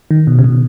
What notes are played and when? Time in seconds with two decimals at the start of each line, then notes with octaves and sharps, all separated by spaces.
0.11 D#3
0.27 B2
0.39 C#3
0.44 B2